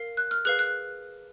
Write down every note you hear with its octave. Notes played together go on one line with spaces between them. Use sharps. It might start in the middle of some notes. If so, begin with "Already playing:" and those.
Already playing: A#4 F5
F#6
F6
G#4 B4 F5 F#6
F#6